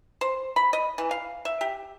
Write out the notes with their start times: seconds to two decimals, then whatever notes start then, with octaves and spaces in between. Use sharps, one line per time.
0.21 C5
0.56 B5
0.73 D#5
0.98 E3
1.11 F5
1.45 E5
1.61 G4